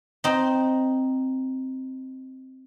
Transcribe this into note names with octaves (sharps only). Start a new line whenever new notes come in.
C4 D#4